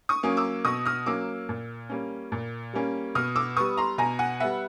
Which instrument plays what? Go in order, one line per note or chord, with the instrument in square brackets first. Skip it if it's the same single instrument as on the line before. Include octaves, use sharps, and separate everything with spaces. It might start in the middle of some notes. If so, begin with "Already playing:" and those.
[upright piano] C#6 D#6
F#3 A#3 C#4
D6 E6
B2 C#6 D#6
D#6 F6
F#3 A#3 C#4 D6 E6
A#2
G3 A#3 C#4
A#2
G3 A#3 C#4
B2 D#6 F6
D6 E6
G3 B3 C#6 D#6
A#5 C6
B2 G#5 A#5
F#5 G#5
G3 B3 E5 F#5